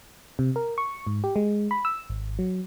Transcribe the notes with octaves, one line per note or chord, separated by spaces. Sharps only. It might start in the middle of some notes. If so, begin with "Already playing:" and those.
C3
A#4
C#6
G#2
G4
G#3
B5
E6
G#1
F#3